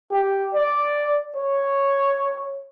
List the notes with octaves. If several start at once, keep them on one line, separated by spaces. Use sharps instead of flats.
G4
D5
C#5